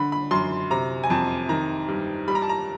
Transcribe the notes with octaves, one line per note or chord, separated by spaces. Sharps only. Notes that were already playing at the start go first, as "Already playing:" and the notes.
Already playing: D3 B5
B5
F#2 C6
C3 A#5
G#5
F2 A5
D#3 A#5
G2
G3 B5
A#5
A5
A#5